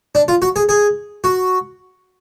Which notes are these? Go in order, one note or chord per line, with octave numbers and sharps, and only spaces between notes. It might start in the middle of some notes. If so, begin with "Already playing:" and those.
D4
F4
F#4
G#4
G#4
F#4